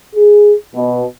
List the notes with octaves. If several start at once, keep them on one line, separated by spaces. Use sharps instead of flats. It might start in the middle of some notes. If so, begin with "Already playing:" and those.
G#4
B2